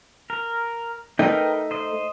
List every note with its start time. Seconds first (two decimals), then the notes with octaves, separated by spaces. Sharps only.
0.30 A#4
1.19 A3 D#4 A#4 B4 G5
1.71 C5 D#5